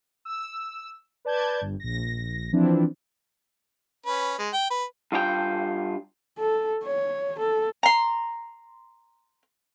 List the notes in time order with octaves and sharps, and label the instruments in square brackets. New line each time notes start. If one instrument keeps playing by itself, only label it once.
[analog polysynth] E6
B4 D5 A5 G6 G#6
G1
A#1 A#6
E3 F3 C4 D4 E4
[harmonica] C#4 B4
G#3
G5
B4
[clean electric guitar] G2 F4 G4 G5
[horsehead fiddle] A4
C#5
A4
[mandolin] A#5 C6